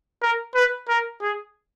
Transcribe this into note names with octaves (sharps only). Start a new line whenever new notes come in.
A#4
B4
A#4
G#4